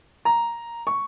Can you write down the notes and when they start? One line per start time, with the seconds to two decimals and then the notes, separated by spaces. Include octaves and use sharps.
0.25 A#5
0.87 C#6